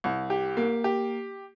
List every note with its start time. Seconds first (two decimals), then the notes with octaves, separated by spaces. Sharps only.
0.04 C2
0.30 G4
0.57 A#3
0.84 G4